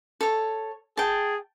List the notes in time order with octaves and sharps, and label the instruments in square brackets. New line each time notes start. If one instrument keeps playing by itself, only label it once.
[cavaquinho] A4 C#5
[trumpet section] G#4 [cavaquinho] G5 A5